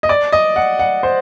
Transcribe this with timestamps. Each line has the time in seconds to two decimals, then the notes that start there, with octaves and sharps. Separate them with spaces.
0.03 D#5
0.09 D5
0.32 D#5
0.56 F#5
0.79 F#5
1.03 C5